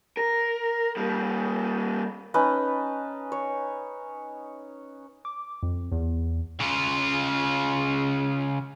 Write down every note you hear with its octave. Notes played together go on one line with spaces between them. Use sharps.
A#4
G3 A#3
C#4 D#4 B4 A5
C#5
D6
F2
E2
C#3 F4